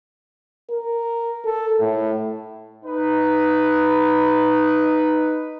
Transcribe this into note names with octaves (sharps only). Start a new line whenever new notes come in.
A#4
A4
A2
D#4 B4